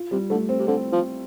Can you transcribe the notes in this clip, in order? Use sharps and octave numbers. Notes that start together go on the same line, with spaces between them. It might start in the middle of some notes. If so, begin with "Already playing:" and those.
Already playing: F4
C3 G3
D3 A3
C4
C3
D3 C4
F3